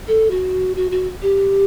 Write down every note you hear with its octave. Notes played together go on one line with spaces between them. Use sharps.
A4
F#4
F#4
F#4
G4